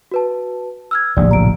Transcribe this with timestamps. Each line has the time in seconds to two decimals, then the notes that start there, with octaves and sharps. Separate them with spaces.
0.11 F#4 B4 A5
0.91 E6 F6 G#6
1.17 D1 A#1 C3 D5
1.31 A#5 D7